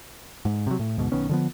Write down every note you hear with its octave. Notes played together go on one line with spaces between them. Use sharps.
G#2
C3 F#3
A2
D2 G#2 B2
B1 D#3 B3 C#4
D3 F3 B3